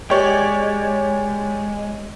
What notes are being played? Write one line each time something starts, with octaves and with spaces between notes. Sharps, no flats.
G#3 G4 C#5 D5